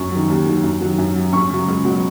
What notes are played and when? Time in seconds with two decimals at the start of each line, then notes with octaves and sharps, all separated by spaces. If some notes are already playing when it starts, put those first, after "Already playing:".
Already playing: F#2 C#6
0.12 D#3 F#3
0.28 D#2
0.46 D#3 F#3
0.64 F#2
0.81 D#3 F#3
0.98 F#2
1.15 F#3
1.33 F#2 C#6
1.50 C#3 F#3
1.68 C#2
1.85 B2 F#3